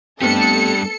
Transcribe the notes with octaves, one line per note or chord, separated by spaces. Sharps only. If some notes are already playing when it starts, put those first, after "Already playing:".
G3 A3 B3 C4 D4 G4 A4 C#7